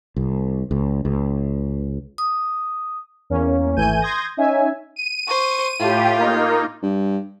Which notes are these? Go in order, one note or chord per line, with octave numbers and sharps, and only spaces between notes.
C2
C#2
C#2
D#6
E2 A#3 C#4
G#1 E3 A3 G#5 G6 D#7
C6 D#6 G6 G#6 A#6
C#4 D#4 E5 G#5
D#7
C5 C#6
A2 F4 G4
A#3 D#4
G2